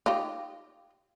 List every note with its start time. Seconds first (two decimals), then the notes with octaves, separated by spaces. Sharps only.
0.06 D#4 F4 G4